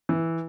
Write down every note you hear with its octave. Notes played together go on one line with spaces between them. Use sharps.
E3